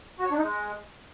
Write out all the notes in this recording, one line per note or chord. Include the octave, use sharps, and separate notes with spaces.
F#4
C#5
D4
D#4
G#3